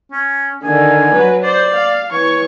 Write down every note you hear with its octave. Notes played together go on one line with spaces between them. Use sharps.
C#4
D3 D#3 G#5
F#3 B4
C5 D5
F5
E3 C#5 C#6